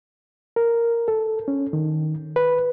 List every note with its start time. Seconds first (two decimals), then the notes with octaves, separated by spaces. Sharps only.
0.56 A#4
1.08 A4
1.48 C#4
1.73 D#3
2.36 B4